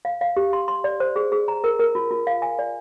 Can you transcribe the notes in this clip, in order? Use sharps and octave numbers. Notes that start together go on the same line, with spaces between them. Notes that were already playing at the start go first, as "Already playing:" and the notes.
F5
F5
G4
C6
C6
D5
C5
G#4
G#4
A#5
A#4
A#4
F4
F4
F5
G#5
D5